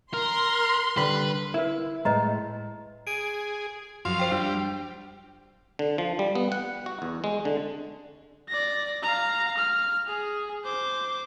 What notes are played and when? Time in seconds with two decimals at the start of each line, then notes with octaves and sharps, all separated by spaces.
0.14 A#4 C6
0.97 D3 G3 B4 B5
1.54 E4 A#4 B4
2.05 A2 G#3 B4 D#5 A#5
3.07 G#4 D7 D#7
4.05 F#2 F3 F5 C6
4.19 C5 G5
4.32 G3 D4
5.79 D3
5.98 F3
6.19 G3
6.35 B3
6.52 F#5
6.86 F#4
7.02 E2
7.24 G#3
7.45 D3
8.49 D5 A#6
9.03 F5 A#5
9.58 F6
10.07 G#4
10.64 C5 D6